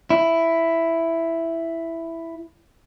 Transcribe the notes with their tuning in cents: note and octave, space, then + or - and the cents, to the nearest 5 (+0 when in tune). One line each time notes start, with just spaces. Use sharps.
E4 +5